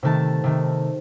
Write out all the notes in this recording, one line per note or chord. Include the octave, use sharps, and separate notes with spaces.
C3 D#3 A3 A5
C3 D#3 A3